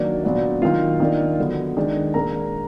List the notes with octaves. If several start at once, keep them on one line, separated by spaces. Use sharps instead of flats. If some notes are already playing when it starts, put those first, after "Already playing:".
Already playing: D#3 F#3 A#3 D4 D5
A#2 F#3 B3 D4
D#3 F#3 A#3 F4 F5
D#3 A#3 D4
D3 F#3 B3
D#3 G#3 D4
A#2 G#3 D4 A#4 A#5